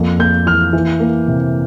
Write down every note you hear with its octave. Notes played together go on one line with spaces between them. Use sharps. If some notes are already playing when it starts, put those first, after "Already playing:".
Already playing: F2 A#3
A#3 G6
E3 F6
E3
A#3
C3